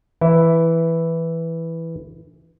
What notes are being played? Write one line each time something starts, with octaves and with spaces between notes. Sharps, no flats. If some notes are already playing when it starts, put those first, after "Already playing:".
E3 E4